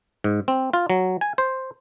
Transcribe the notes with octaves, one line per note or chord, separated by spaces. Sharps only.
G#2
C4
F4
F#3
G#5
C5